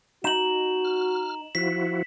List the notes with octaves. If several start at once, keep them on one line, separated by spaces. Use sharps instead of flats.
D#4 F#4 E7 F#7
F6
F3 E4 F#4 B6